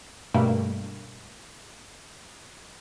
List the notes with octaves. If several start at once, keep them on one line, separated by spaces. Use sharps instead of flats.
G2 B2 G3 A3 A#3 D4